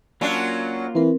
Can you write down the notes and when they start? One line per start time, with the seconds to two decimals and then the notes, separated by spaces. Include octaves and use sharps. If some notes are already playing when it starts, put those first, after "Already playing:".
0.21 F#3 A#3 C#4 D4 F4
0.95 E3 C4 A#4